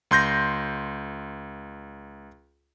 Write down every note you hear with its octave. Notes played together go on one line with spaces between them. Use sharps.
C#2 C6 G6 A#6